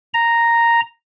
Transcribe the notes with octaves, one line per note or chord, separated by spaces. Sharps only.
A#5